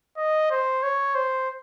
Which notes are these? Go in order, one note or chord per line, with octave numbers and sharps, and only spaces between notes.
D#5
C5
C#5
C5